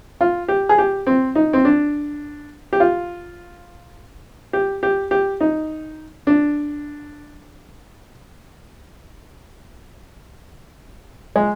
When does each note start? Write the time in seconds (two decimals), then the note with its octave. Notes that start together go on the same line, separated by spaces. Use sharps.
0.21 F4
0.48 G4
0.69 G#4
0.78 G4
1.07 C4
1.36 D#4
1.53 C4
1.65 D4
2.73 G4
2.80 F4
4.53 G4
4.83 G4
5.11 G4
5.41 D#4
6.27 D4
11.36 G#3